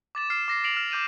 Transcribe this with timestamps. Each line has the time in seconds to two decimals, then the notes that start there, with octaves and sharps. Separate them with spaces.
0.15 D6 A6 E7
0.30 F6 C7 E7
0.48 D6 A#6 C7
0.64 A#6 C7 D7 F7 F#7
0.77 F6
0.91 D6 G6 D#7 E7